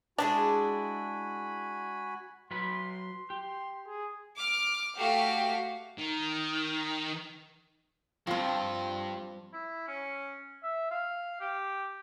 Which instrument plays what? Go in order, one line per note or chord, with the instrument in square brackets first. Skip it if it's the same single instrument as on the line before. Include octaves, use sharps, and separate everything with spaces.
[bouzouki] G#3 E4 D5 [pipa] D4 [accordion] F#4 G#5 B5
[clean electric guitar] F#3 B4 B5 [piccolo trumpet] C6
[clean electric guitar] G4 [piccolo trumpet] C6
[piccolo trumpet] G#4
[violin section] D6 F6
A3 F#4 G4 F5
[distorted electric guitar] D#3
[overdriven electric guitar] G2 [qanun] F3 C4
[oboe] E4
C#4
E5
F5
G4